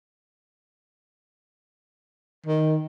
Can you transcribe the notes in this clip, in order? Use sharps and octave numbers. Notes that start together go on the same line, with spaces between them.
D#3